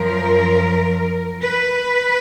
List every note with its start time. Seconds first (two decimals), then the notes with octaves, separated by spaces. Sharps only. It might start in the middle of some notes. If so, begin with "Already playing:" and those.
Already playing: F#2 F3 A#4
1.41 B4